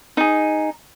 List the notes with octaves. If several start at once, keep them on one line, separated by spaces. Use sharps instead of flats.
D#4 G#4